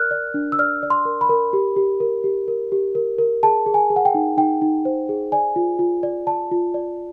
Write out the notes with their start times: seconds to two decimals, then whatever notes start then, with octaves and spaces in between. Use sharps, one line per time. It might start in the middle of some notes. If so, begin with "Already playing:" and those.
Already playing: A#4 D5 F6 F#6
0.11 D5
0.34 D4
0.52 E6
0.59 D5 F6
0.83 D5
0.90 C6
1.05 A#4
1.21 B5
1.29 A#4
1.53 G4
1.76 G4
2.00 A#4
2.24 G4
2.48 A#4
2.72 G4
2.95 A#4
3.19 A#4
3.43 G#4 A5
3.66 G#4
3.74 G#5
3.90 G#4
3.96 F#5
4.05 G5
4.14 D#4
4.37 D#4 G5
4.62 D#4
4.85 C5
5.09 G#4
5.32 D5 G#5
5.56 F4
5.79 F4
6.03 D5
6.27 D5 A5
6.51 F4
6.74 D5